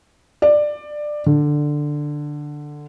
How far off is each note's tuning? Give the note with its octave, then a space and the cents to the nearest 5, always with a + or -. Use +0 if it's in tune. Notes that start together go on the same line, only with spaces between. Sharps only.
D5 +15
D3 +10